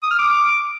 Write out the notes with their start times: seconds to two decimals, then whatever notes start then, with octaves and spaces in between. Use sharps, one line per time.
0.03 D#6
0.11 F6
0.19 D6